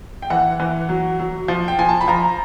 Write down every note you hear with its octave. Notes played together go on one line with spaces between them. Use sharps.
G5
E3 F#5
E3
F#3
F#3
F3
G5
F3 G#5
A5
B5
F3 A#5